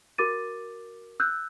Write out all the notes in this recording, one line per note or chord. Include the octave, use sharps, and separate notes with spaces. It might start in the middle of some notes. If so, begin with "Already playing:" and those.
F#4 A#4 D6 A6 D#7
E6 F#6 G6